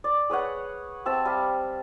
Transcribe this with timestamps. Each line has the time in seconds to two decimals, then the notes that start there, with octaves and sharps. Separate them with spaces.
0.04 D5
0.30 G#4 B4 C#5 F#5
1.06 C4 G4 E5 A5
1.25 G3 F5